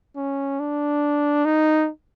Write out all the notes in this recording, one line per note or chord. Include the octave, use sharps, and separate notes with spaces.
C#4
D4
D#4